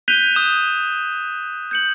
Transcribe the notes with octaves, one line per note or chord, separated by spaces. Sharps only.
F#6 G6 B6 D#7 F7 G7
D#6 E7
G6 C#7 F#7